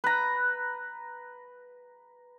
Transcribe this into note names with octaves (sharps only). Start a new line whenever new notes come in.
B4 A#5